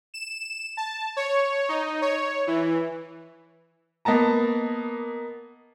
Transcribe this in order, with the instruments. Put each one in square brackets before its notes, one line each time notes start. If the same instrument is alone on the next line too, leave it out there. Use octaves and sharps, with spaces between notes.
[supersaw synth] E7
A5
C#5
D#4
C#5
E3
[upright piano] A#3 B3 D#5 A5 A#5